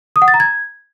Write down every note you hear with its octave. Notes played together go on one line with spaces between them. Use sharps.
D#6
F#5
A6
A#5
G#6